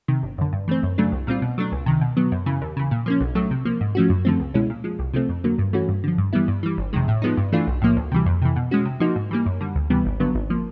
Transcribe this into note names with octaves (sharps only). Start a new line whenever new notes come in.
C3 D#3
G1
F#2 D3
G2
E3 A3 C4
F#2
C#3 F#3 A3 D4
C2
A#2 G3 C4 F4
B2
F#3 A3 D4
C#2
C3 D#3
B2
F#3 B3
F#2
C#3 E3
D#2
C#3 E3
A#2
F3 A#3 C#4
B1
A2 F#3 A3
C3
F3 A#3
G#2
F3 A3 C#4 F#4
F#2
D3 F3 A3 C4
C#2
B2 G#3 C#4 E4
A#2
F3 G#3
C2
C3 F3 A3 C4
F2
D3 F#3 A#3
G2
E3 A3 C#4 F#4
G2
D3 F3
G2
E3 G3 B3 E4
G2
E3 G3
G1
F2 C3 D#3 G#3
A2
F3 G#3 B3 D#4
G2
E3 A3 D4 F4
B1
A2 F3 A#3
D2
C3 E3 G3
F2
C3 E3
B2
G#3 C#4 F#4
C3
F3 A#3 D#4 F#4
G#2
E3 G3 A#3
F#2
D3 G3
D2
C3 E3 G3 B3
G#1
G2 D3 F#3 B3
G#1
F3 A#3